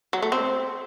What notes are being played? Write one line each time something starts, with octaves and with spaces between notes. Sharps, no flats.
F#3
A3
C4